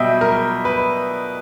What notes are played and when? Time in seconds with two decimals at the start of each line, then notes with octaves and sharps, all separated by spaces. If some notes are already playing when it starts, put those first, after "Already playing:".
Already playing: B2 G3 D#5 E5 G5
0.21 A#4
0.65 B4